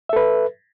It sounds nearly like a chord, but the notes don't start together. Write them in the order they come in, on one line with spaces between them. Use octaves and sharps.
E5 A4 B4